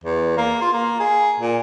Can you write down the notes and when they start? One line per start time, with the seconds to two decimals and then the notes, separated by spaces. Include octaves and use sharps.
0.04 E2
0.37 A#3
0.61 F4
0.73 A#3
1.00 G#4
1.40 A#2